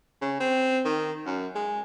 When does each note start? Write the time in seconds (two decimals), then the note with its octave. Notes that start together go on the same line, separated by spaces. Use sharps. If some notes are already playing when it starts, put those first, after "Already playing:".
0.21 C#3
0.40 C4
0.84 D#3
1.26 F#2
1.55 G#3